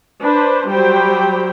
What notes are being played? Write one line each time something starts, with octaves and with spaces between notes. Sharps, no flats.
D4 B4 C5
F#3 G3 G4 C5 G5 B5